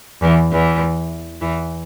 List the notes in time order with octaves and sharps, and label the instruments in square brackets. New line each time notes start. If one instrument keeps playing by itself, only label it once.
[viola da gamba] E2 E3
E2 E3
E2 E3